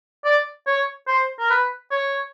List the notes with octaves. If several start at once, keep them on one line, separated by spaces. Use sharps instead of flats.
D5
C#5
C5
A#4
B4
C#5